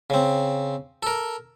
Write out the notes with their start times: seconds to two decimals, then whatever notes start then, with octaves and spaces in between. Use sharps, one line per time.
0.10 C#3 C4
1.03 A4 A#4